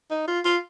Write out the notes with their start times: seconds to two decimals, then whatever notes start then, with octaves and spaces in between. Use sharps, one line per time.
0.11 D#4
0.28 F4
0.45 F4